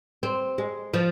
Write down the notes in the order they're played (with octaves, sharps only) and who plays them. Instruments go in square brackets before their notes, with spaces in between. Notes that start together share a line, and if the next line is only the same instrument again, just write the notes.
[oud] C4
G#3
F3